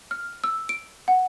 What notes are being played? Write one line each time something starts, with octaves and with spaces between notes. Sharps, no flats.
F6
E6
D7
F#5